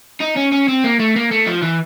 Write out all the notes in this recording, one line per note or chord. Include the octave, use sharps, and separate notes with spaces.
D#4
C#4
C#4
C4
A#3
A3
A#3
A3
F3
E3